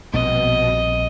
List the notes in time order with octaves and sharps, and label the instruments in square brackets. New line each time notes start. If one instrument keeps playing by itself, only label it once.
[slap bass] A#1 G3 C4 [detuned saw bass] B2 [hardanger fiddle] D#5